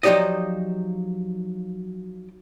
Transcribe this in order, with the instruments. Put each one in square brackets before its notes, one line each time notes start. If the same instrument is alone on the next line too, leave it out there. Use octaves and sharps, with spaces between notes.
[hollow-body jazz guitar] F3 F#3 D#4 G4 D5 D#5